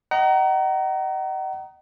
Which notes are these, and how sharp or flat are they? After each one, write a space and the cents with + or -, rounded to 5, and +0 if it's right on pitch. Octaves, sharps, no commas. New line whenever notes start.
D#5 +0 F#5 +40 A#5 +0